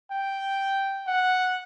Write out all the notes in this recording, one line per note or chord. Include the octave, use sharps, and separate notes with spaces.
G5
F#5